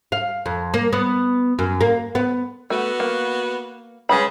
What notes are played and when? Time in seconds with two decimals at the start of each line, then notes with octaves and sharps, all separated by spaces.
0.12 F5
0.46 F2
0.74 A#3
0.93 B3
1.59 F#2
1.81 A#3
2.15 B3
2.70 A3 B3 F#4
3.00 A#3
4.09 C#3 G#3 B4 B5